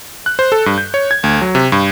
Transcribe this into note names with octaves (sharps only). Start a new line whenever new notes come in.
F#6
C5
A4
G2
G6
C#5
G#6
D2
F#3
C3
G2